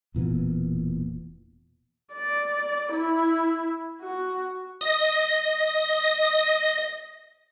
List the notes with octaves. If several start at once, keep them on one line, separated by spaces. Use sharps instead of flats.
E1 A#2 E3 B3
D5
E4
F#4
D#5 A#6